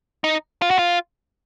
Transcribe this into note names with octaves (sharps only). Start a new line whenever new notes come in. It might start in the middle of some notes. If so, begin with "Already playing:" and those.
D#4
F4
F#4
F4